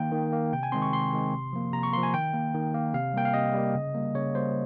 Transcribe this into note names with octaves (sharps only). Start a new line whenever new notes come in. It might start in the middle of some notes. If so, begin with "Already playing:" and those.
Already playing: D#3 A#3 G5
D#3
A#3
C3 G5
G#5
D#3 G#3 C4 C6
C#6
C3 C6
D#3 G#3 C4
C3
F3 A#3
C3 A#5
C#6
F3 A#3 C6
G#5
D#3 G5
A#3
D#3
A#3
C3 F5
G3 A#3 G5
F5
C3 D#5
G3 A#3
C#3
G3 A#3
C#3 C#5
G3 A#3 C5